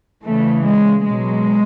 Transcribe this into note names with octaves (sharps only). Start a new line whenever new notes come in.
C#3 E3 A3
G#3
B2 F#3 G#3